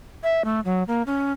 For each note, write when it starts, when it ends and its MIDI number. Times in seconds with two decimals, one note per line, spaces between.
0.23 0.44 76
0.45 0.60 57
0.65 0.83 54
0.88 1.02 58
1.07 1.32 61